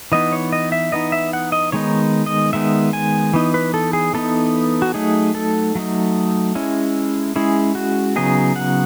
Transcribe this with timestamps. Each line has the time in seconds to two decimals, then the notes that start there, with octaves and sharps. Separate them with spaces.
0.12 E3 B3 D#4 D#5
0.32 C#5
0.52 D#5
0.72 E5
0.92 E3 B3 D#4 D#5
1.12 E5
1.33 F#5
1.52 D#5
1.72 D#3 G#3 B3 D#4 C#5
2.26 D#5
2.53 D#3 G#3 B3 D#4 E5
2.93 G#5
3.34 E3 B3 D#4
3.54 B4
3.74 A4
3.93 G#4
4.14 E3 B3 D#4 A4
4.82 F#4
4.94 F#3 A3 D#4 G#4
5.35 A4
5.75 F#3 A3 D#4
6.55 G#3 C#4 E4
7.36 G#3 C#4 E4 G#4
7.75 F#4
8.16 C#3 F#3 B3 D#4 G#4
8.56 F#5